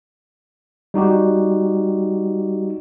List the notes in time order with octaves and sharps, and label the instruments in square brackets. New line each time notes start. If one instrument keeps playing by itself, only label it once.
[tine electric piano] G3 D#4 F#4 G4